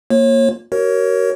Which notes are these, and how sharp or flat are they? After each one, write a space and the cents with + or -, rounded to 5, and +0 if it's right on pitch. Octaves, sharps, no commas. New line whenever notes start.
A#3 +0 F4 +30 C#5 -30
F#4 +35 A#4 +0 C#5 +0